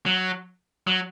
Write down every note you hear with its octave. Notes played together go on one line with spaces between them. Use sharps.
F#3
F#3